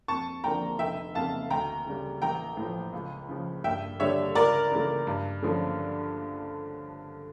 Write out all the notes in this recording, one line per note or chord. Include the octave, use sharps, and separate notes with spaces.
F2 A5 C#6
D3 F3 A#3 D4 G5 A#5
F1 E5 G5
F2 C#3 F5 A5
D2 G5 A#5
C#3 G3
A1 G5 A#5
A2
F3
C#2
C#3 F3
G2 E5 G5
D3 G3 D4 C#5 E5
C#2 A#4 D5
C#3 E3 A3
G2
D3 F3 A3 C#4